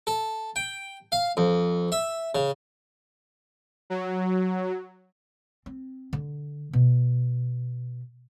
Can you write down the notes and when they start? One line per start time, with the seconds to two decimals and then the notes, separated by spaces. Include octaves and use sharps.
0.07 A4
0.56 G5
1.12 F5
1.37 F2
1.92 E5
2.35 C#3
3.90 F#3
5.66 C4
6.13 D3
6.73 B2